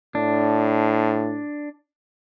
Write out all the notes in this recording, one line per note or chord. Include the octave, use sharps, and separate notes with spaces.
A2 D4